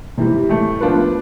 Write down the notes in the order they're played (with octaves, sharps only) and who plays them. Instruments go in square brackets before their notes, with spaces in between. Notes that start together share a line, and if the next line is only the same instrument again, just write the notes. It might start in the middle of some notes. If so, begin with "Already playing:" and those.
[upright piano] C3 E3 G3
A2 E3 A3
F3 B3 D4 F4 B4